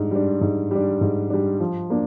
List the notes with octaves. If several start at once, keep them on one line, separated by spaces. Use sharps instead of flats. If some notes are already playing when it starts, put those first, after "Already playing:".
Already playing: G#2 G3 D4
G3 D4
G#2
G3 D4
G#2
G3 D4
F3
A#3 D4